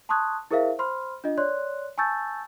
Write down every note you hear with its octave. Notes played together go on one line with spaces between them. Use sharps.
A5 C6 C#6 D#6 F#6 G#6
E4 G#4 A#4 C5 E5 F5
C5 B5 C6 F6
D4 F4 D#5
C#5 D5 C6 F#6
G#5 A5 C#6 E6 G6 A6